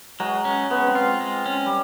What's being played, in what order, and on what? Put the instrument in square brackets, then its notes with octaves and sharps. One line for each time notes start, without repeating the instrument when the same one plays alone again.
[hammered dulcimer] F#3 [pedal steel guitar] G#3
[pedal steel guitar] C#4
[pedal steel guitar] G#3 [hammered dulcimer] B3
[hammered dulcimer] C4
[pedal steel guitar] F4
G#3
C#4
[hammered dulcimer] G3